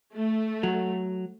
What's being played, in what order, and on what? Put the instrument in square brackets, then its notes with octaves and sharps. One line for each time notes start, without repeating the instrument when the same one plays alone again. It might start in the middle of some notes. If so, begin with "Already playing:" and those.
[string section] A3
[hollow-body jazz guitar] F#3